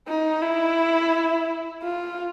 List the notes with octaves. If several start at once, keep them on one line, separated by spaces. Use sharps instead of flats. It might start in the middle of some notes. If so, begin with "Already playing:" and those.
D#4
E4
F4